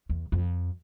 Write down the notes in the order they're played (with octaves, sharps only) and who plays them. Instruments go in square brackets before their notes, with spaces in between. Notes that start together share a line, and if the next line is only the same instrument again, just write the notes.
[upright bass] E2
F2